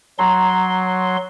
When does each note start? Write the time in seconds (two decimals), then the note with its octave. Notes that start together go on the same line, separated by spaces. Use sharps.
0.19 F#3 A#5 C6 C7